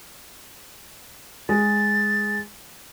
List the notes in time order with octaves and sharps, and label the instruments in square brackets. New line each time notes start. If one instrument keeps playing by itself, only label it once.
[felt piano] G#3 [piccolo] A6